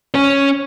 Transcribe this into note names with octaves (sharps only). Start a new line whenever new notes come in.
C#4